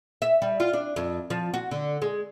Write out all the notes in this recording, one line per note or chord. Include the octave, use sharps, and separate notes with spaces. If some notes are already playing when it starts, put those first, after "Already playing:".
E5
G3
F4
D4
F2
F3
F#4
D3
G#3